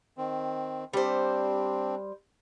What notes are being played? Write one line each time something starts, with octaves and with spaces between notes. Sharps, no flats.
D#3 C4
G3 C4 D4 C5